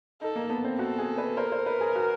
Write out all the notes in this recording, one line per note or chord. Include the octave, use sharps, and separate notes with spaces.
D#4 A4
A#3
B3
C4
F#4 A4
G#4
B4
A#4 C5
C5
B4
G#4
F#4